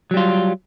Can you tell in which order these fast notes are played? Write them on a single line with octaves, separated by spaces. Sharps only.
F#3 G3 F4